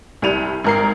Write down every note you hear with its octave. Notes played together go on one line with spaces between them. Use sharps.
C2 G3 D#7 F7
G#1 A#4 C7